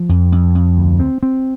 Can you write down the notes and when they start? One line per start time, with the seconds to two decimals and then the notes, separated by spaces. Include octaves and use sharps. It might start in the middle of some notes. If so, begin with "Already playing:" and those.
Already playing: F3
0.09 F2
0.32 F2
0.55 F2
0.77 D2
1.00 C4
1.23 C4